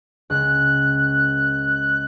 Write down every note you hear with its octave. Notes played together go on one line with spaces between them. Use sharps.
C#2 F#6